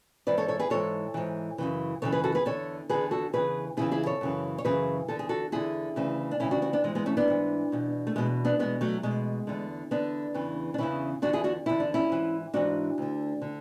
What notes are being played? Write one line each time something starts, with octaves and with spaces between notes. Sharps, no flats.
G#2 E3 B4 D5
A4 C#5
A4 C#5
G#4 B4
G#2 E3 A4 C#5
G#2 E3
F#2 C#3 E3
F#2 C#3 E3 A4 C#5
G#4 B4
F#4 A4
G#4 B4
E2 D3 A4 C#5
E2 D3 G#4 B4
F#4 A4
E2 C#3 E3 G#4 B4
E2 C#3 E3 E4 G#4
E4 G#4
A4 C#5
F#2 C#3 E3
C#5
F#2 C#3 E3 G#4 B4
E2 D3 A4
G#4
F#4 A4
E2 D3 E4 G#4
D2 C#3 E3
D4
D2 C#3 E3 C#4 E4
D4 F#4
D4 F#4
B3 D4
G#2 E3 G#3
G#3 B3
A3 C#4
B3 D4
G#2 E3
E2 B2
A3
E2 B2 G#3
B3 D4
E2 B2 G#3 B3
F#3 A3
E2 B2 G#3
E2 D3
E2 D3 B3 D4
E2 C#3 E3
D4
E2 C#3 E3 C#4 E4
E2 D3 D4 F#4
E4 G#4
D4 F#4
E2 D3 E4
D4
C#4 E4
G#2 E3
G#2 E3 D4 F#4
D2 D3
D3